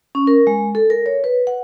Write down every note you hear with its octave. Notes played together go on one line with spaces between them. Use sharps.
C#4
A#4
G#3
A4
A#4
C#5
B4
F#5